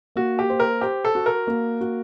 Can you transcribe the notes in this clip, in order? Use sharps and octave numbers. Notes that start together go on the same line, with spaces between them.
A#3 F#4
G4
C5
A#4
G4 C5
A4
F#4
A#4
A#3
F#4